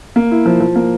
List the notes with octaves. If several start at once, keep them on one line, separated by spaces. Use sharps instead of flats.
A#3
E4
F3
F3
A#3